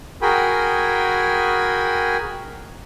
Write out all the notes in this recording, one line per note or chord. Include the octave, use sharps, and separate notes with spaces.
F#4 G#4 A#4 G5 G#5 B5